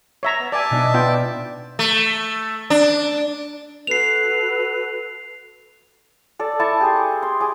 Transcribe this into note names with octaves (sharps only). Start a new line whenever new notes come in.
C#5 E5 A#5
B3
D5 E5 G#5 A5
B2 D4 D#4
B3 F4 G5
D5
A3
D4
F#4 A4 B4 C7 F7
A4 D5
E4 A5 C#6 D6
G4 G#4 C6
C6
G#4 D6